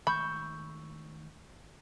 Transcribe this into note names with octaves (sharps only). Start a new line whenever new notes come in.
D#3 G#3 A3 B5 C#6 E6 G6